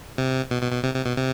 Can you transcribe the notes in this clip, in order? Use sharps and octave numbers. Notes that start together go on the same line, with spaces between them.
C3
B2
B2
B2
C3
C3
B2
C3